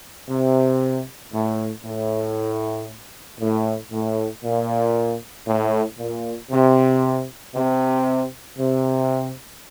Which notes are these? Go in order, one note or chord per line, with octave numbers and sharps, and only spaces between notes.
C3
A2
A2
A2
A2
A#2
A2
A#2
C3
C3
C3